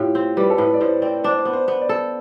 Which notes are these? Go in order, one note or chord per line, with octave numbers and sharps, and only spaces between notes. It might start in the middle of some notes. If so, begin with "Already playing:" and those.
Already playing: A2 F4 G4
C4
G3 B4
A4
A2 B4
D5
A2 C5
C4 D5
D4 C5
D5
C5
B3
C5
B3
D5
A4